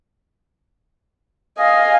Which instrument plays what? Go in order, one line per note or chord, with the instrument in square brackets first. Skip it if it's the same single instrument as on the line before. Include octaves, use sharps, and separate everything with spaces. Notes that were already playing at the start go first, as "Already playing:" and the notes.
[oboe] D#5 [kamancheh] F5 G#5